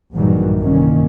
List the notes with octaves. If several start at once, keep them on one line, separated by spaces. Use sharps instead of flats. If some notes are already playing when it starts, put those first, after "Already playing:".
A#1 G2 D#3 E3 F#3 G3
G1 C2 G2 A#2 D#3 C#4